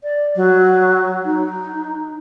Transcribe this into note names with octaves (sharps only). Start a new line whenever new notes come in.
D5
F#3
D#4